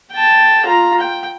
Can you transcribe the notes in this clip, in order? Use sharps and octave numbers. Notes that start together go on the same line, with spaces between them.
G5 A5
F4 A#5
G5